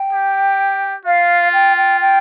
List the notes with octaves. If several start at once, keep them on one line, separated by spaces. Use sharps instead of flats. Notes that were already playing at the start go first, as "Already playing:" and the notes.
Already playing: G5
G4
F4 F5
G5
G5
G5